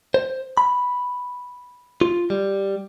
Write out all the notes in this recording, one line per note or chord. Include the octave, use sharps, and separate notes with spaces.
C5
B5
F4
G3